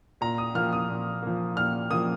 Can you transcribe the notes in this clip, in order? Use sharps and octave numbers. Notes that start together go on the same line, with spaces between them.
A#2 A#5
D#6
F3 A#3 F6
D#6
A#2
F3 A#3
A#2 F6
F3 A#3 D#6